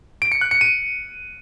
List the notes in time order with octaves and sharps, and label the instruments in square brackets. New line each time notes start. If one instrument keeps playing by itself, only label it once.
[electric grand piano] D7
C#7
F#6
C#7
D#7